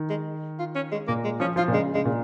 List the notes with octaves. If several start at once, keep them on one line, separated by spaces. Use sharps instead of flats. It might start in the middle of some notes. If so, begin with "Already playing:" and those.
Already playing: D#3
G#3
F4
C#4
G#3
A#2 A#3
G#3
F3 C#4
F3 F4
A#2
C#3 G#3
C#3 G#3
A#2